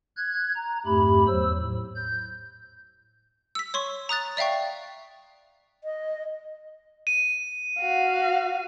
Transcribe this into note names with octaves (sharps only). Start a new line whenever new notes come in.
F#6 G#6
A#5
F2 G#2 A3 G4 B5
E2 F#3 C5 E6
A2
G6
E6 B6
C#5 C6 C#6
A#5 D#6 F#6 A6
D5 E5 F5 G5 C#6
D#5
D#7
F#4 F5